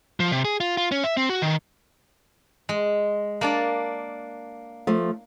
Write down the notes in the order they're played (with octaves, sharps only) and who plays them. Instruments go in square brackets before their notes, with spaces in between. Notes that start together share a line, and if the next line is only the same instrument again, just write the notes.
[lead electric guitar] F3
C3
G#4
F4
F4
C#4
E5
C4
F#4
D#3
[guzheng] G#3
A#3 D4 D5
[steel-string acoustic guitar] F3 A3